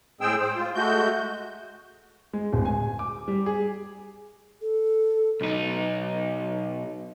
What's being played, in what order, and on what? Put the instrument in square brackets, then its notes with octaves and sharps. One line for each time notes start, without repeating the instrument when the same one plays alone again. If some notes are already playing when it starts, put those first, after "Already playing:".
[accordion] A2 G#3 C4 G#4 G5 E6
C5
F4
G#3 A3 F#4 G6
[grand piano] G#3
D1
G#5
D6
G3
G#4
[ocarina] A4
[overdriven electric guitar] B1 D#4